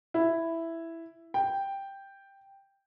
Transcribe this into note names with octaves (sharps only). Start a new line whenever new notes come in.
E4
G5